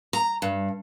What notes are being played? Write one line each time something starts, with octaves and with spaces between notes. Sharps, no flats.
A#5
G2